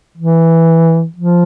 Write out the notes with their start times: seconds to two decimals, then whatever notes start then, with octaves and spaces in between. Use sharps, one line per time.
0.18 E3
1.17 F3